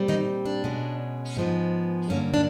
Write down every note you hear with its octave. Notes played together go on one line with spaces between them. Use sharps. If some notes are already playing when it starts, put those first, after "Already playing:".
Already playing: A#2 G3 C4
D#3 D#4
D4
B2 G#3 C#4
G#2 F3 G#3 B3
G2 D3 F#3 A#3 C#4
D4